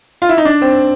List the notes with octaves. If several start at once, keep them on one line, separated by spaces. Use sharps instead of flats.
F4
E4
D#4
D4
C4